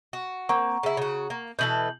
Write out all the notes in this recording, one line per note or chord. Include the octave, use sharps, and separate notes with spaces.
F#4
A#3 C4 F#5 A#5 C#6
C#3 E4
C#3 F#4
A#3
B2 E3 A4 G6 F#7